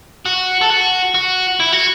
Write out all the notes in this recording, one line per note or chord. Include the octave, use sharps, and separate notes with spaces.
F#4
A4
F#4
F#4
E4
F#4